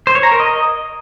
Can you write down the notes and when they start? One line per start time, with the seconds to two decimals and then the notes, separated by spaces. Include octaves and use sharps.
0.07 C5
0.15 C#5
0.23 A#5
0.31 A#4
0.40 D#5